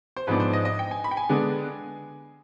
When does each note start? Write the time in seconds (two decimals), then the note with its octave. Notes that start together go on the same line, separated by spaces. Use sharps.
0.16 C5
0.27 G#2 F3 B3 D4 B4
0.40 C5
0.53 D#5
0.65 D#5
0.79 G5
0.91 G#5
1.04 B5
1.11 G5
1.17 G#5
1.29 D3 G#3 B3 D4